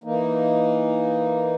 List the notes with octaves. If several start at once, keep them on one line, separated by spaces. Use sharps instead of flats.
E3 A#3 D#4